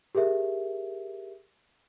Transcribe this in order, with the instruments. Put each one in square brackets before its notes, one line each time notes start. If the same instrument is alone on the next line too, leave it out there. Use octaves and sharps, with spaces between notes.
[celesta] G4 G#4 A#4 E5